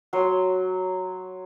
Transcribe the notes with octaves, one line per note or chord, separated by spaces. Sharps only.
F#3 C#5 C6